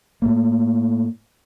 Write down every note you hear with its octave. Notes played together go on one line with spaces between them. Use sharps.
A2 A3 A#3